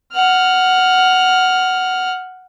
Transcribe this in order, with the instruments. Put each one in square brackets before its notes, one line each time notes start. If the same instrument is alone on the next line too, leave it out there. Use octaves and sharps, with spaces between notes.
[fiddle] F#5 F6